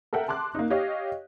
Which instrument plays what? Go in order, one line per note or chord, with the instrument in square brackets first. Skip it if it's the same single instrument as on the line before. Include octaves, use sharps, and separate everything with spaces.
[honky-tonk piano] A4 A#4 E5 F#5 G5
A5 C6 D6 F#6
A#3 D#4
G4 C#5 D#5 F5